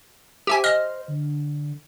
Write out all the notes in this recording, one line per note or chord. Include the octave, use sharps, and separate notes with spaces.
G4 C5 E5 G#5
D#5 F6
D3